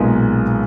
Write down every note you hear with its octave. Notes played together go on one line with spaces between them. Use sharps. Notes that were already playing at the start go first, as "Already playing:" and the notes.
Already playing: B1 A#2 G#3 B3 G#4